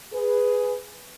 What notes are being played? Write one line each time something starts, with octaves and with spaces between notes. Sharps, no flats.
G#4 B4